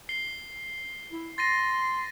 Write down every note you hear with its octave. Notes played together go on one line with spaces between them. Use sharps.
C7 G7
E4
C6 A6 A#6 D#7